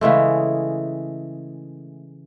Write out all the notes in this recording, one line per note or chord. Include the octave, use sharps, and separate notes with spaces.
C#3 E3 G#3 A3